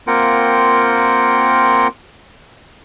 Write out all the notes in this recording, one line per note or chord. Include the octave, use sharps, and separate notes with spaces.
A#3 C4 F4 A#4 F#5 G5